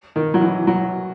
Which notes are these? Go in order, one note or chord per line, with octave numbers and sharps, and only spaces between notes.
D#3
F#3
E3
F#3